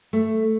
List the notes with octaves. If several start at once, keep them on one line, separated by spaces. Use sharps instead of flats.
A3